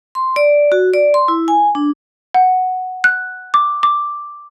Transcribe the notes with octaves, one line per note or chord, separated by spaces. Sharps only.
C6
D5
F#4
D5
C6
E4
G#5
D4
F#5
F#6
D6
D6